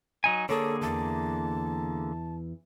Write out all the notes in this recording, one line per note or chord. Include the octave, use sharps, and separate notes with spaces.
F#3 D#4 G#5
D3 A#3 G#4 A4 C#5
E2 E3 A5